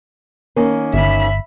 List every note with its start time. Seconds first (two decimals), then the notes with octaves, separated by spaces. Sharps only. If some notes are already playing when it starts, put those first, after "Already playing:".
0.56 D#3 A#3 C#4
0.93 G1 E5 B5